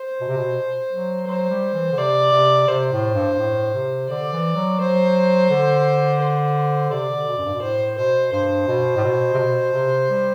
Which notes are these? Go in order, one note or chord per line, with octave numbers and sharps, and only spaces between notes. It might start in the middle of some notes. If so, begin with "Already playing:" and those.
Already playing: C5
B2
C3
B2
F#3
F#3 C5
G3
E3
D3
C3 D5
C3
C3 C5
A2
G2
G2
A2
C3
D3 D5
E3
F#3
F#3 C5
D3
C5
C3 D5
D3
B2
F#2
G2
B2
A2 C5
B2 C5
G2 C5
B2
A2
B2
C3
B2
C3
G3